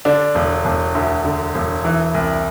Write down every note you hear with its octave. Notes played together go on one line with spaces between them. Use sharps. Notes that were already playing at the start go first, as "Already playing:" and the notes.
D3 D4
E1
E1
D2
D3
E1
E3
C2